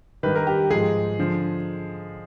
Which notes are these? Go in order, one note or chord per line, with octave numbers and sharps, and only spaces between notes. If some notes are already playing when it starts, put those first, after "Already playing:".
G2 D#3 B4
A#4
G4
G#2 F3 G#4
D3 F3